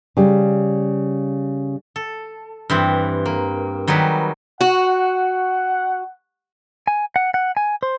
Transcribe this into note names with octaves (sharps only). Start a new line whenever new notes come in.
C#3 G3
A4
G2 E3 C4
A#3
D#3 F#3 G3 G#4 B4
F#4 F#5
G#5
F#5
F#5
G#5
C5